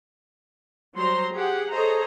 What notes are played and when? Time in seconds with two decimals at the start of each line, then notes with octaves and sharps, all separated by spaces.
0.96 F#3 G3 C5 A#5 C6
1.33 G4 G#4 F#5
1.71 G#4 A4 C5 C#5 D#5 A#5